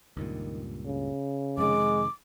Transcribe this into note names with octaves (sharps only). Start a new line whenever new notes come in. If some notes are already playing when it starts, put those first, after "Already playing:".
C#2 G2 A#2 D#3
C#3
F2 C3 D#3 G#3 D6